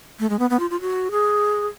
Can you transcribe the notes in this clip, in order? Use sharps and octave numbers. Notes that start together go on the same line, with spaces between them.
A3
G#3
B3
B3
F4
F4
F#4
G#4